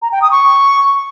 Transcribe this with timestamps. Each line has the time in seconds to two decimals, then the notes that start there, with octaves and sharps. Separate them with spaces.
0.02 A#5
0.12 G5
0.22 D#6
0.31 C#6